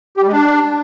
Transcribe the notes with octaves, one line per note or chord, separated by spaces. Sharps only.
G4
G3
G#3
D4